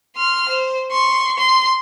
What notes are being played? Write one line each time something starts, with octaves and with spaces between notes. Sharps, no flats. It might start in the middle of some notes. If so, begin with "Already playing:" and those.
C6 F6
C5
C6 C#6
C6